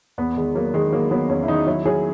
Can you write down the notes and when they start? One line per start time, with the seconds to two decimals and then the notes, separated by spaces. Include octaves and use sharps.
0.18 E2 B3
0.36 D#3 G#3
0.55 F#3 A#3
0.74 D#3 G#3
0.92 F#3 A#3
1.11 F#3 B3
1.29 E2 C#4
1.43 E4
1.48 D#3 D#4
1.67 F#3 E4
1.85 F#3 G#4